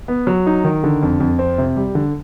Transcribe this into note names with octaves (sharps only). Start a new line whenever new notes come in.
B3
F#3
D#4
D#3
D3
F2
F2
C4
C3
G3
D3